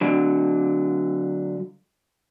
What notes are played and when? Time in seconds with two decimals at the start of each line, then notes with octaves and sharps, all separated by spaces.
0.01 D3 F#3